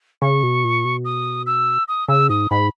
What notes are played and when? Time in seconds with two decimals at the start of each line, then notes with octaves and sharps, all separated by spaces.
0.22 C#3 C#6
0.43 B2
0.64 A#2
0.85 B2
1.05 D#6
1.46 E6
1.88 D#6
2.08 C#3 E6
2.29 G#2 D#6
2.50 G#2 B5